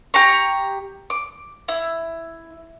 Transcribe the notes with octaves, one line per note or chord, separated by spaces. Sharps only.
G4 A#5 C#6
D6
E4